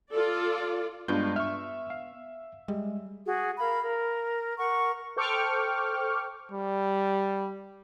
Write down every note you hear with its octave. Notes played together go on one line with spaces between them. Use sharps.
F4 A4 D5
G2 G#3 B3 D4 F4 G6
E5 C#6 F6
F5
G3 G#3
F#4 G#4
A#4 F5 B5
A#4
A#4 F#5 C#6
A4 C5 G5 C#6 D6 F6
G3